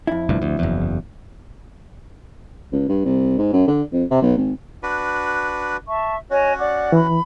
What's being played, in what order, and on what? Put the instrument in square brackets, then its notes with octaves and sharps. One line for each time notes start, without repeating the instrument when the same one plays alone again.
[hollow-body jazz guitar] F2 E4
[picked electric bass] F1 D2 G2
D2
F#1 E2
[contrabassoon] C#2
G2
C2
G#2
F#2
D3
F2
C3
B1
G#1
[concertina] D4 F#4 B4
[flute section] E5 A5 C#6
[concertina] C#4 F#4 [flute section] C#5 D#5 G#5
[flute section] D5 F#5 D6
[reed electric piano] E3 [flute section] B5